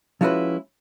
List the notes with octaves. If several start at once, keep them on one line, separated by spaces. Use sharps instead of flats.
F3 G#3 C#4 E4 F#4 B4